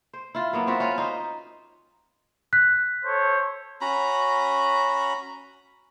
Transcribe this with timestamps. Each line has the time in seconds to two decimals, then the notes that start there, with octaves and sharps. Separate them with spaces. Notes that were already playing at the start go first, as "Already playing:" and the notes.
0.13 C5
0.35 E4 F4
0.53 F#3 A#3 B3
0.67 C4 F4 F#4 E5
0.80 C#4 F4 B4
0.98 D#4 C5
2.53 F#6 B6
3.05 A4 C5 C#5
3.81 C#4 F#4 A#5 B5